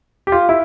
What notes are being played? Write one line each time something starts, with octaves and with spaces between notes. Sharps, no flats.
G4
F4
E4